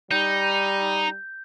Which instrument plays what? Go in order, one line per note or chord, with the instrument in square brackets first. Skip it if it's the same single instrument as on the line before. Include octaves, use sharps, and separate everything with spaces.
[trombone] G3 [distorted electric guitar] D#4 [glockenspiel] G6